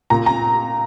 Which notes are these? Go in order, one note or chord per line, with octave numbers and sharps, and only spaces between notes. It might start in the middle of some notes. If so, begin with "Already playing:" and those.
A#2 A#5
A#5